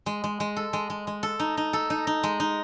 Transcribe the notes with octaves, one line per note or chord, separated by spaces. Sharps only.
G#3
G#3
G#3
A4
G#3
G#3
G#3
A4
D#4
D#4
A4
D#4
D#4
G#3
D#4